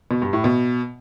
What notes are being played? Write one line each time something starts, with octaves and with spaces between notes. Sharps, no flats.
B2
G2
A2
B2